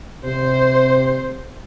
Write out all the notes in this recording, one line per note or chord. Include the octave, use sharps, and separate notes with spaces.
C3 C5